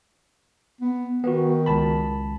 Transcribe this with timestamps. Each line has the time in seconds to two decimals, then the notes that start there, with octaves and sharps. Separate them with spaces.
0.81 B3
1.24 D#3 B3 F#4
1.66 C#2 A5 B5